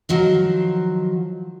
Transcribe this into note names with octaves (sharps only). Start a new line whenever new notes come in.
D#3 F3 F#3